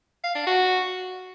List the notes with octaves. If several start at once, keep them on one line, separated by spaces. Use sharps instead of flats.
F5
D4
F#4